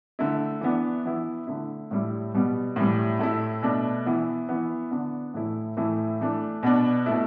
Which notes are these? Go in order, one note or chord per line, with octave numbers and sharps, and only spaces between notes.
D3 A3 E4
E3 B3 D4
E3 B3 E4
D3 A3 E4
A2 G3 E4
B2 G3 B3
A2 E3 G3
A2 A3 E4
B2 A3 D4
E3 B3 E4
E3 B3 E4
D3 B3 D4
A2 E3 A3 E4
A2 E3 A3 E4
E3 A3 D4
B2 B3 D4
B2 A3 E4